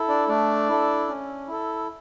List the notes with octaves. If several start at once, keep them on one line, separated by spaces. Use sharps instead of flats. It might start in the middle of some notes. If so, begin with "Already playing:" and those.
Already playing: E4 A4
D4 D5
A3 D4 D5
E4 A4
C#4
E4 A4